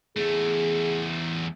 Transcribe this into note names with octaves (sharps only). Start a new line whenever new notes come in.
E2 A3 G#4